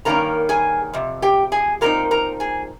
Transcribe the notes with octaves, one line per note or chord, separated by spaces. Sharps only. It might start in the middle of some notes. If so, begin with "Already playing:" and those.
G2 D#3 A#3 C#4 A#4 A#5
G#4 G#5
F2 C3
G4 G5
G#4 G#5
A#2 F3 C4 D#4 A#4 A#5
A#4 A#5
G#4 G#5